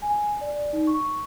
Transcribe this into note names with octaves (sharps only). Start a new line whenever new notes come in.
G#5
D5
D#4
C#6